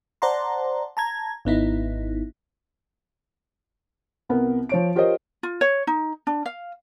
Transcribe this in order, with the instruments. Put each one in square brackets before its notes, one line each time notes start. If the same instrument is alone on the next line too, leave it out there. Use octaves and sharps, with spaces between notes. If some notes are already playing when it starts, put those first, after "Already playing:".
[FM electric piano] C5 D5 F#5 A5 A#5 C6
A5 A#5 G#6
G#1 B3 D#4 E4
[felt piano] C2 B3 A#4
F3 C#5 D7
F4 G4 A#4 C5 C#5 D#5
[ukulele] F4
C#5
D#4
D4
F5